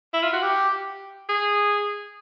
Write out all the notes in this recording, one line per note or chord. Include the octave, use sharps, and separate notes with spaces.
E4
F4
F#4
G4
G#4